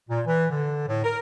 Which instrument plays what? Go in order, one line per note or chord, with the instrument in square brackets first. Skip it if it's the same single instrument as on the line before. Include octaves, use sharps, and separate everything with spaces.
[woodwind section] A#2
E3
D3
A2
A#4